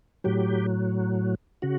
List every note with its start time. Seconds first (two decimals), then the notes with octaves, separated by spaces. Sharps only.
0.24 A2 F#3 G4
1.62 C#3 F#4